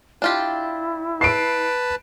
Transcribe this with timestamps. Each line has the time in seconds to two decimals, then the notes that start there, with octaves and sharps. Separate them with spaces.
0.22 D4 E4 F4 G4
1.21 B4 A5 C7 D7